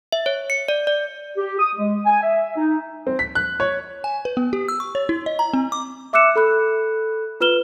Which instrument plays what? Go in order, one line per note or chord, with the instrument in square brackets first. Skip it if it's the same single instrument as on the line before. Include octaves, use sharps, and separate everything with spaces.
[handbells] E5
C#5
C#7
D5
D5
[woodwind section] G4
D#6
G#3
G#5
E5
D#4
[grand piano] C4
B6
F#6
C#5
[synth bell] G#5
B4
B3
G4
E6
C#6
C#5
E4
D#5
A#5
C4
D6
[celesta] E5 D6 E6 F#6 C#7 E7
A4 B5 F#6
F4 B4 F6 E7 G7